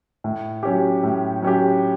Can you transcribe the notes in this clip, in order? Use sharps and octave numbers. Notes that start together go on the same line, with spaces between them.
A2
F#3 C#4 G4
A2
F#3 C#4 G4